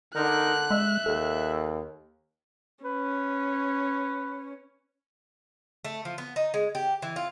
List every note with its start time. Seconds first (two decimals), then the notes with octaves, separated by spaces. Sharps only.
0.15 D3 D#4 A#4 F#6
0.71 G#3 E5
1.06 D#2 A4
2.84 C#4 B4
5.84 A3
6.05 F3
6.18 B3
6.36 D#4
6.54 G#3
6.75 G4
7.02 E3
7.16 F4